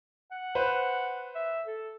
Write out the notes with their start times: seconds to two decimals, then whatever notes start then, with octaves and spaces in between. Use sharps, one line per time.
0.31 F#5
0.55 B4 C5
1.35 E5
1.66 A4